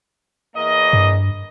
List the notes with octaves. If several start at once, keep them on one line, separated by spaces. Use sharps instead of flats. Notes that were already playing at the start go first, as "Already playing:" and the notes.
E2 A#3 D#5
G2